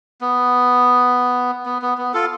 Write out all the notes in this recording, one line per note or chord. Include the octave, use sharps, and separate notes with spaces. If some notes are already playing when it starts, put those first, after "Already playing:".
B3
B3
B3
B3
F4 A4